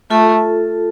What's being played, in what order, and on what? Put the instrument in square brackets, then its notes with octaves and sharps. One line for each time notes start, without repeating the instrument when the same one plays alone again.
[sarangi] A3 [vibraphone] F4 A4